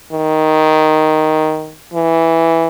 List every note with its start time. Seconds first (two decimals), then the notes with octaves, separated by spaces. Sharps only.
0.12 D#3
1.93 E3